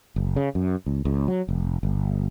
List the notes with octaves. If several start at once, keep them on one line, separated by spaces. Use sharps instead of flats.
F#1
C#3
F#2
C#2
C#2
F#3
F1
G1